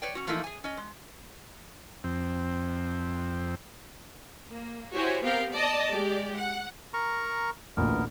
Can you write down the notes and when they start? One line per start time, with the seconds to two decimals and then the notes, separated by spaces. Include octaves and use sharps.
0.02 B4 C#5 D5 G5
0.15 C#4 F#4
0.27 E3 F3 A3 A#3 D#4 E4
0.44 G#4 G#5
0.64 C#4 D#5
0.77 G#3
2.04 F2 C4
4.50 A#3
4.94 E4 F#4 G4 C5 C#5 G#5
5.23 B3 C4 G4 A#4 F5 G5
5.53 D5 D#5 A5
5.89 G#3 G4 D5
6.37 F#5
6.94 A#4 A#5 C#6
7.77 A1 D2 A#2 B3 A#4